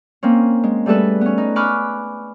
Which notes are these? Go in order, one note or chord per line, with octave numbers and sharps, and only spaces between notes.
A#3 C4 C#4
G#3
G3 A3 G#4 A4 B4
B3 C#4
D#4
G#5 B5 C#6 D6 F6 F#6